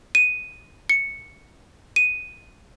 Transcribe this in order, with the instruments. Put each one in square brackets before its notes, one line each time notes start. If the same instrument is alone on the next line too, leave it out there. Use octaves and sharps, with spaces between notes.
[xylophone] D#7
C#7
D#7